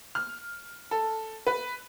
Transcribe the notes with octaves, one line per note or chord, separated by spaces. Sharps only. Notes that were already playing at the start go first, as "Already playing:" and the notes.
F6
A4
B4